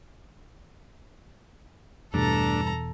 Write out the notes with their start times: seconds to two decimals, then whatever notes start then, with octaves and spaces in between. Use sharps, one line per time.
2.14 E2 G2 B2 A3 D4 A4 A#5